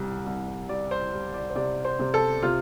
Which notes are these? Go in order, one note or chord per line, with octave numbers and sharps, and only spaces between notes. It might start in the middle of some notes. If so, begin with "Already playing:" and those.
Already playing: C2 G3
C2
G3 D5
C5
G3
D5
C5
C3 D5
C5
C3
A4
C3 F4